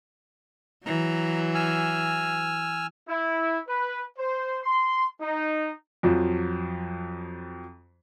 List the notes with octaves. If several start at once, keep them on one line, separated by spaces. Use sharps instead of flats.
E3 F#3 A#5
G#5 E6 F6
E4
B4
C5
C6
D#4
F2 F3 F#3